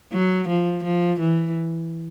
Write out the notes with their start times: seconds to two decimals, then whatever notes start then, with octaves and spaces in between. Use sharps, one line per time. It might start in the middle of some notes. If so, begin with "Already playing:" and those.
0.12 F#3
0.48 F3
0.84 F3
1.20 E3